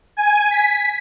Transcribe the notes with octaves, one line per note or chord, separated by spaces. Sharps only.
G#5
B6